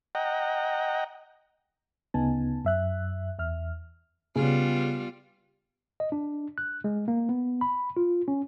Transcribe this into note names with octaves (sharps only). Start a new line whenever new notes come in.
D#5 F#5 G5 A#5
D2 C#3 B3 D#4 G#5 A5
F#2 E5 F#6
E2 E5 F6
C#3 G3 B3 F4
D#5
D4
F#6
G#3
A#3
B3
B5
F4
C#4